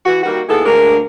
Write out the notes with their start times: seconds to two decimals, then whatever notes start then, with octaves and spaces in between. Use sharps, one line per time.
0.06 E3 F#4
0.23 D#3 G3 A#3 F#4
0.49 D#2 G#3 B3 E4 G#4 A4
0.66 D2 G#3 A#3 D4 A#4